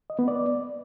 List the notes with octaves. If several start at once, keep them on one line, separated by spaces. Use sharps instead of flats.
D#5
B3
D5